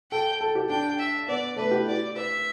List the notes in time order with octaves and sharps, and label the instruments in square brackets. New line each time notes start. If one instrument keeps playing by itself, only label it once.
[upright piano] A4 [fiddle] G5
[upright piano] A4
G4
[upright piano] D4 [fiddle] G5
[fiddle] E5
[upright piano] B3 [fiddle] D5
[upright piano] A3 [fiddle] B4
[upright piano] G4
E4
[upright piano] G4 [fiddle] D5
[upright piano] B4 [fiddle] E5